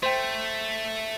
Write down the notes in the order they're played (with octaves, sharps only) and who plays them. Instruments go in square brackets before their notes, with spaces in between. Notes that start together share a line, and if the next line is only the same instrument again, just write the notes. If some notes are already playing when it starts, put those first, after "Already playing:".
[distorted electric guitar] A3 [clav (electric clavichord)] C5 G5